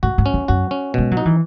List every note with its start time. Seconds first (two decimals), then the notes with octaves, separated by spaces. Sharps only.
0.03 G#2 F#4
0.18 G#2
0.26 C#4
0.34 E2
0.48 F#2 F#4
0.71 C#4
0.94 B2 G#3
1.11 F#3
1.17 D#4
1.25 E3